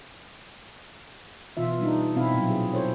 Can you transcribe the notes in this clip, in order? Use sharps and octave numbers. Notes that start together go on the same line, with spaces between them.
B2 E3 F4 E5
G3 D4 D#4
B2 C4 E4 F5
A#2 F#3
G#4
E4 A4 C5 C#5